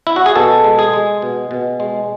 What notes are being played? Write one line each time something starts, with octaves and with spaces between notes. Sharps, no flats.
E4
F#4
G#4
B2 A4
G#3
G#4
G#3
B2
B2
G#3